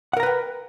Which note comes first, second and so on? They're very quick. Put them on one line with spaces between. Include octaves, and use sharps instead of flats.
F#5 A#4 A#5 B4 G5